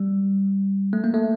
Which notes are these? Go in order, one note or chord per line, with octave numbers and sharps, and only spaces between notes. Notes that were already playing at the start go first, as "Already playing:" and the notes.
Already playing: G3
A3
A#3
A3